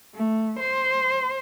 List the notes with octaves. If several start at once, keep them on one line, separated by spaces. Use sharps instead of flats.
A3
C5